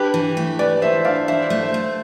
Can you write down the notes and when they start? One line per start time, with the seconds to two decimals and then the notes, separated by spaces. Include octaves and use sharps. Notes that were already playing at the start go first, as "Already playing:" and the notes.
Already playing: D4 G4 B4
0.14 E3
0.37 A3
0.59 E3 B4 D5
0.82 A3 C5 E5
1.05 D4 D5 F5
1.28 E3 C5 E5
1.50 A3
1.62 C5 E5
1.74 A3